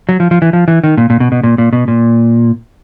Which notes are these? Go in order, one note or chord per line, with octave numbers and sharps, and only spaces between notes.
F#3
F3
F3
E3
F3
E3
D#3
A#2
A#2
B2
B2
A#2
A#2
B2
A#2